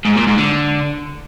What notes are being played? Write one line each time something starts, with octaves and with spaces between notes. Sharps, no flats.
G#2
A#2
G#2
D3